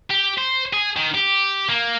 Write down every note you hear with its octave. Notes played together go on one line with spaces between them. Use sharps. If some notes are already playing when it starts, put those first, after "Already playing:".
G4
C5
G#4
D#3
G4
A#3